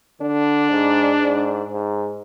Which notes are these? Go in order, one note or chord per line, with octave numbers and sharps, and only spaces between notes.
D3 D4
G#2
G#2
G#2